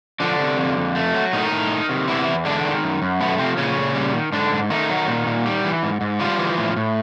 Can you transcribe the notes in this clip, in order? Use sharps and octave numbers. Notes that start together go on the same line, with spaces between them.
D3 F3 D4
C3
F2
F2
A3
F#3
A2 D#3 D#4
A2
D#3
C3
E2 E3 E4
E2
D3 G#3 D4
D#3
F#2
F#2
B2 A3 B3
C3 F3 C4
A#2 C#3 C#4
A#2
G3
D#3
G#2 D3 D4
G#2
D#3 A3 D#4
F#3
A#2
A#2
G3
E3
G#2
G#2
F3 G3 F4
E3
A2
A2